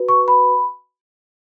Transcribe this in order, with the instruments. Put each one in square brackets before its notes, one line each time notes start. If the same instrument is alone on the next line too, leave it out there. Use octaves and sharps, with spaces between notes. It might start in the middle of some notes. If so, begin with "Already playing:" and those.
Already playing: [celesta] F#4 B4
C#6
B5